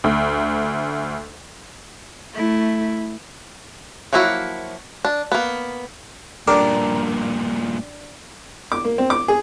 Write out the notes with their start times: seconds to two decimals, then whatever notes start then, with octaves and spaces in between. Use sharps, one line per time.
0.04 D2
2.33 A3 E4
4.13 F3 F#3 A#3 E4 F#4
5.05 D4
5.32 A#3 B3
6.48 G2 A#2 D4 G4 A#4 D5
8.72 D6
8.84 A#3
8.98 C4
9.10 D6
9.28 G#4